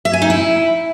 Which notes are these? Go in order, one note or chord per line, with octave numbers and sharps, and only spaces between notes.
E5
G#5
D#4
E4